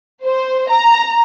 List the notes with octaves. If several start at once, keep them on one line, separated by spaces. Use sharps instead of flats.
C5
A#5